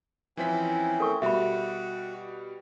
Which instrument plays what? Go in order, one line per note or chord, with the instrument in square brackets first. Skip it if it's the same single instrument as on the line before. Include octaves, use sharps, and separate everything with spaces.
[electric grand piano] E3 F3 B6 [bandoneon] C4 C#4 E4
[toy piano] A4 A#4 C#6
[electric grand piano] B2 G3 [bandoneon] F#4 [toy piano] E5 B5